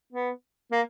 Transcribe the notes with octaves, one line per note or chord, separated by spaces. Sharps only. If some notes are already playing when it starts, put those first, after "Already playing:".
B3
A#3